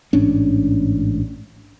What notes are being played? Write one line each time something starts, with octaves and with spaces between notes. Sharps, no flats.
A1 G#2 C#4 D4